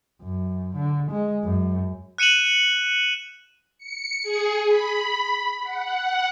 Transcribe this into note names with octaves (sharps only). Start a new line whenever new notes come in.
F#2
D3
G#3
F#2
F#6 C#7 D#7 E7 F#7
C#7
G#4
B5
F#5